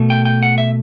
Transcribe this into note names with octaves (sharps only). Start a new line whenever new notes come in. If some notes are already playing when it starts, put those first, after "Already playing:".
Already playing: B2 A3
G5
G5
F#5
E5